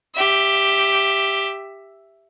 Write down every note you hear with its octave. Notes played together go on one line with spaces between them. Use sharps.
G4 E5